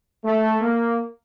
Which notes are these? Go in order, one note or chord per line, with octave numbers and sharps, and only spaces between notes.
A3
A#3